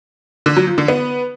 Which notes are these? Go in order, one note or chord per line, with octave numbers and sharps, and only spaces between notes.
D3
F#3
F3
D3
B3